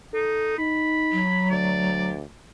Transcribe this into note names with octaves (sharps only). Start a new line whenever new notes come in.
D#4 A4
D#4 B5
F#3
D2 D5